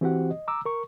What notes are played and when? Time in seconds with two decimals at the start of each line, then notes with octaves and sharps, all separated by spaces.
0.01 E3 C4 F#4 G4 C5 F#5
0.31 D#5
0.48 A#5 D6 E6
0.65 A#4 C#6